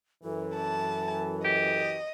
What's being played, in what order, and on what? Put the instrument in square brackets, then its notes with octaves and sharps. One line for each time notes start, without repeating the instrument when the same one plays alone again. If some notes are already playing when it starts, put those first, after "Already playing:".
[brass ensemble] F#2 E3 [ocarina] A4
[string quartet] A5
[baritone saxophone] G4 [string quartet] D#5